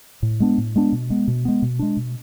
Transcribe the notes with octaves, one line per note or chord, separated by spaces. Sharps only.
A2
G#3 B3 D4
A2
G#3 B3 D4
B2
G#3 B3
B2
G#3 B3
B2
G#3 D4
B2